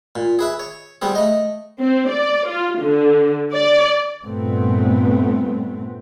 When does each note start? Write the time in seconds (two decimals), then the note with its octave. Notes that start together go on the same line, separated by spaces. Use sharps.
0.16 A#2
0.39 G#4 B4 E5
0.59 C#5
1.02 G3 B3 C4 G#4
1.15 A3 D#5
1.78 C4
2.09 D5
2.47 F4
2.80 D3
3.54 D5
4.22 G2 A#2 C#3 A3 B3 C4